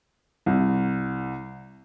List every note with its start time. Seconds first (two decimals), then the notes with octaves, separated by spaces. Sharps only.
0.46 C2